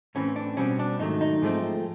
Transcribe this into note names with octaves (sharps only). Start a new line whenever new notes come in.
A2 E3 A3 C4 C#4
D4
B2 G3 C4 C#4
D4
G#2 D#3 F#3 A3 D#4
D#4
G#2 F3 A3 C4